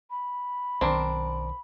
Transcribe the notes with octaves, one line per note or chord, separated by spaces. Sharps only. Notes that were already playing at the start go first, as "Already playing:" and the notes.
B5
B1 D#3 C4 D4 A#4